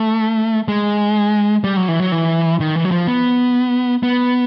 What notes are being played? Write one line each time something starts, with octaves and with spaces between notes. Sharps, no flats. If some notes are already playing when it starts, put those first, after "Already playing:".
Already playing: A3
G#3
G3
F#3
E3
F#3
E3
D#3
E3
F#3
F3
B3
B3